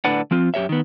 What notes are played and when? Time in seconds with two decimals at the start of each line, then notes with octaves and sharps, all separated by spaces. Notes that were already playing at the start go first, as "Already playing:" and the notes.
0.05 A2 D3 D4 B4 D5 F#5
0.31 F3 C4 F4
0.54 F#2 G4 C#5 E5
0.69 D#3 B3